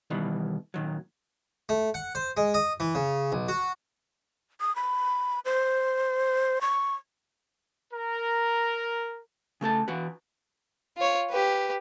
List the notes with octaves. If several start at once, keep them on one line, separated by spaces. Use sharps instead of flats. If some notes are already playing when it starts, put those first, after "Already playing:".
B2 D#3 E3 G3 B3
A#2 D#3 F#3
A3
F#5
C5
G#3
D#5
E3
C#3
B1
F#4
D#6
B5
C5
C#6
A#4
C#3 A3 A4 A5
E3 F#4 B4
F4 C#5
G4 B4